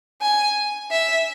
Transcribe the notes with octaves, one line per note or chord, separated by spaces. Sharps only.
G#5
E5